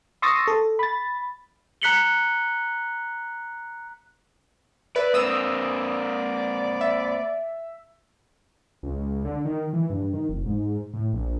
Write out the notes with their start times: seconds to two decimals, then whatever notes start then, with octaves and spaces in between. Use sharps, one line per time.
0.22 C6 C#6 D#6 E6 A6 A#6
0.48 A4
0.79 B5 A6
1.82 A#5 F#6 B6 C#7 F#7 G7
4.96 B4 D5 E5
5.14 A#3 C4 D5 D#6 E6
6.81 E5
8.83 C#2
9.25 D3
9.45 D#3
9.73 E3
9.90 G2
10.13 D#3
10.29 F1
10.46 G#2
10.94 A2
11.13 A#1